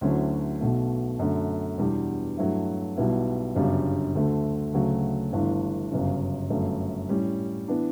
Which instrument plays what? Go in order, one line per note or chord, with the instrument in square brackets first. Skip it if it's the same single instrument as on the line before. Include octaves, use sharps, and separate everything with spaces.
[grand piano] D2 D3 F#3 C#4 E4
B1 B2 A3
F#2 D3 A3
E2 B2 G3 D4
G2 F#3 A3 E4
B1 B2 G3 B3 E4
G1 F#2 C#3 G3 D4
D2 D3 A3
D2 C#3 F#3 A3
G1 G2 E3 A3
G1 F#2 C#3
G1 F#2 D3 A3
A2 G3 C#4
E3 B3 D4